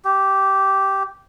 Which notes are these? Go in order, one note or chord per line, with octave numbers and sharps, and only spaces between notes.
G4